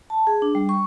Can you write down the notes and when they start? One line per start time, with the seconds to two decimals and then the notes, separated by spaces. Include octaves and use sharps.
0.10 A5
0.27 G#4
0.42 D4
0.55 G3
0.69 C#6